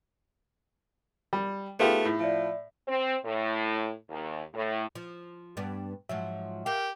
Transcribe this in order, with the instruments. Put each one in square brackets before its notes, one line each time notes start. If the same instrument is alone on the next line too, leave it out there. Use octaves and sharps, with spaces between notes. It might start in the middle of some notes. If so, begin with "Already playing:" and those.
[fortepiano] G3
[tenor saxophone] A3 [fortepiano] B3 F4 G4 [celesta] D#4 G#4 F7
[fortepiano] A2
[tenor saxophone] F3 [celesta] D5 E5
[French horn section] C4
A2
D#2
A2
[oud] F3
G2 B3 D4
[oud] G#2 F3 F#3 [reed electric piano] E5 F#5
[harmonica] G4 [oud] A#4 F5